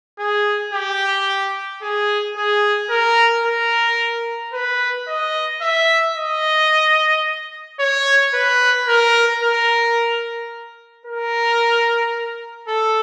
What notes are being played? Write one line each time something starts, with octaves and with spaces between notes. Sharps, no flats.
G#4
G4
G#4
G#4
A#4
A#4
B4
D#5
E5
D#5
C#5
B4
A#4
A#4
A#4
A4